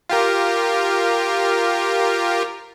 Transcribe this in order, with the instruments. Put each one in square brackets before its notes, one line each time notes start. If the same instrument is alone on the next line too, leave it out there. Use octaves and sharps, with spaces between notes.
[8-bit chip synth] F4 G4 A#4